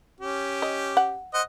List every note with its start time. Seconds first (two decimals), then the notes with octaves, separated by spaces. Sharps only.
0.20 C#4 G4
0.62 D#5
0.97 F#5
1.34 C5 D#5 F#5